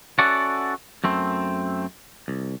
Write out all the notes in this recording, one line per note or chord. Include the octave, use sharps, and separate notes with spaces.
C#4 F#4 A4 D5 E5 F#5
F#2 A3 C4
C2